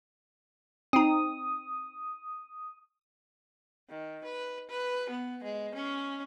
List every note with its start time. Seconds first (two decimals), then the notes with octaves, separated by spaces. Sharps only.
0.93 C4 D#4 D#6
3.89 D#3
4.25 B4
4.69 B4
5.09 B3
5.43 G#3
5.75 C#4